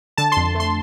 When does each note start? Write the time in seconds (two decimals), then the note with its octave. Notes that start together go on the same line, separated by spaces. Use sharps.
0.17 D3 A5
0.32 F2 C6
0.55 A3 C6